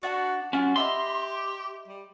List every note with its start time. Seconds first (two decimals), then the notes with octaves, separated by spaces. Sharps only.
0.03 D4 F#4 F#5 A5
0.53 F#3 C#4 F4 F#5
0.76 G4 D#5 E5 B5 C6
1.88 G3